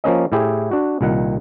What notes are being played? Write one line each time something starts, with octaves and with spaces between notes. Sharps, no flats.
F3 A#3 C#4 D#5
A2 E4 G4 G#4
D4 F#4
C2 A#2 D#3 F#5